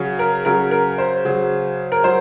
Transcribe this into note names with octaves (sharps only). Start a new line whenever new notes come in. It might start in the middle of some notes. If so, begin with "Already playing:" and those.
Already playing: C#3 F#3
A#4
C#3 F#3 A#4
A#4
C5
C#3 F#3
A#4
F#3 C5